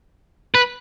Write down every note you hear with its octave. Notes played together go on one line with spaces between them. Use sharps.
B4